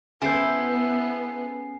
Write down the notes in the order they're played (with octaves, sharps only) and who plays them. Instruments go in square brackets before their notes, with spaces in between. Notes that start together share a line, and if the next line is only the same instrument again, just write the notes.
[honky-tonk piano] C#3 G6 [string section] B3 [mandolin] C4 E4 A4 [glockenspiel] G#5 C7